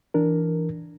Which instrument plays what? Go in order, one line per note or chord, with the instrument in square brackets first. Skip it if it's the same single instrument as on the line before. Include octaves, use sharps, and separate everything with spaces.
[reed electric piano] E3 D4 A#4